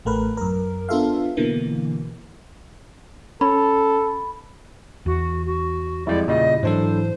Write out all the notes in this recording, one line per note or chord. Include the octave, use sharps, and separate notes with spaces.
A1 A3 A#4 B4
F#2 A#4
B3 D4 F4 A4 E5 F5
B2 D3 E3 A#3
C#4 A4 B5
E2 F#4
F#4
F2 G3 G#3 E4 D5
A#2 C#3 G3 D#5
G#2 E3 F#3 D4 A4 C5